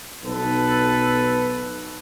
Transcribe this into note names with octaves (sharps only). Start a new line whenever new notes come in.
B1 B3 A4 B4